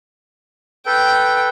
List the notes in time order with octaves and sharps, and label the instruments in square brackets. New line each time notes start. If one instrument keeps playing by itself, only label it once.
[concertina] A4 B4 [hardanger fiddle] G5